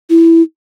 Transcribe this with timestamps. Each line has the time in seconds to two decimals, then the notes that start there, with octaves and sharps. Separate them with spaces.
0.10 E4